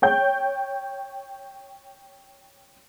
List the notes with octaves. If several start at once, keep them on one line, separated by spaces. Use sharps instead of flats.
C#5 G5 G6